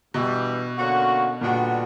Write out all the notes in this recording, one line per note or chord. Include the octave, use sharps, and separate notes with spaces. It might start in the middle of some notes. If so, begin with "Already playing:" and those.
G2 B2 E3 G3
D3 A#3 C#4 F#4
A#2 D3 G3 B3 D4 F#4